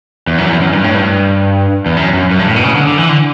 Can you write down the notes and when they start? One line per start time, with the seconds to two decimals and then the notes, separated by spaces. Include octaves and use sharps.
0.27 E2
0.38 F#2
0.49 E2
0.61 F#2
0.73 G2
0.84 A2
0.95 G2
1.86 E2
1.96 F#2
2.13 F#2
2.30 F#2
2.39 G2
2.47 A2
2.56 B2
2.64 C#3
2.75 D3
2.87 D3
2.98 E3
3.09 D3